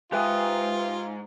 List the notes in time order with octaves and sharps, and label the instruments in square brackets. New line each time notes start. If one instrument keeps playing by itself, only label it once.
[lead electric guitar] G#2 [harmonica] F4 [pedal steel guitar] G4 G#5 D#6 [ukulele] B4 E5 G5